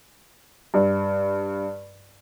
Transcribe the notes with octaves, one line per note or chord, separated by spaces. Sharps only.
G2